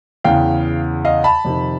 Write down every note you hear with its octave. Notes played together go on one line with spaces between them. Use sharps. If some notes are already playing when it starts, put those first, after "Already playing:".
E2 C#3 E3 F5 G5
D#5 F5
A5 B5
F2 C3 D#3